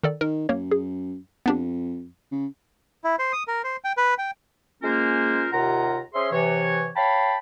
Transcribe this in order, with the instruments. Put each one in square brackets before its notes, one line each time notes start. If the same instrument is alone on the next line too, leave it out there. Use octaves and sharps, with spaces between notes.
[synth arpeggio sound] D#3 A4 D5
[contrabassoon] D#3 [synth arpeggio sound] A#4
[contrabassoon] F#2 [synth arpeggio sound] A#3 C#5
[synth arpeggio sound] G#4
[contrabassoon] F2 [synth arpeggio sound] B3 D4 G4
[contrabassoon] C#3
[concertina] E4
C5
D#6
A#4
C5
G5
B4
G5
[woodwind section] G#3 A#3 C#4 F4 A#4 C5
D#2 C3 F4 F#5 A#5
C#4 G#4 C5 E5 C6
C3 E3 C#5
C#5 F5 G5 A5 B5